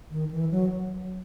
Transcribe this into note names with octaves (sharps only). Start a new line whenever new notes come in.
D#3
E3
F#3